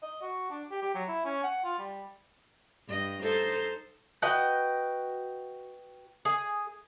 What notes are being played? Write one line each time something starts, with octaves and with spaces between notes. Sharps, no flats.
D#5
F#4
D4
G4
G4
F#3
E4
C#4
F#5
F4
G3
G2 D#5
D#4 A4 C5
F#4 B4 D#5 G5
G#4